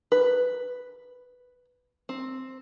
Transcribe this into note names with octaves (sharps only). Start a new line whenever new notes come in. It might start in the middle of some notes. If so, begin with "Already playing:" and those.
B4
C4